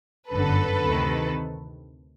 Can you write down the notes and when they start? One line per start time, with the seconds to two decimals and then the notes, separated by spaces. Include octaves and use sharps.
0.29 G1 F#2 D3 A4 B4
0.84 D2 C3 D#3